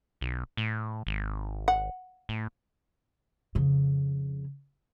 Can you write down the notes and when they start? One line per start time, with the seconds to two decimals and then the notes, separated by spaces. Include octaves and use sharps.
0.21 B1
0.57 A2
1.07 G#1
1.68 F#5
2.29 A2
3.55 F2 C#3